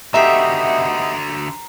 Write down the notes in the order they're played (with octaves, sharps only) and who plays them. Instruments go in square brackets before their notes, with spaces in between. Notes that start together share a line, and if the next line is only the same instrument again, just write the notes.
[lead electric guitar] D3 F#4 [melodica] B3 D#4 [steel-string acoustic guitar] G4 E5 [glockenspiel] A#5 C7